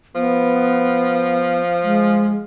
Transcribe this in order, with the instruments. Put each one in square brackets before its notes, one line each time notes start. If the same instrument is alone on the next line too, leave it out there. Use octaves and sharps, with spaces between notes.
[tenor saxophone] F3 [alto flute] B3
[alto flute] G#3